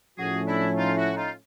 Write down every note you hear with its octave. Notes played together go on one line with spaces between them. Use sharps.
A2 F3 A3 C#4 F#4 G#4
D4 E4
D#4 F4
E4 F#4
D#4 F4